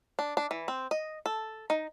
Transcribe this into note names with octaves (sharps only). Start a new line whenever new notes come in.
D4
D4
E3
C4
D#5
A4
D#4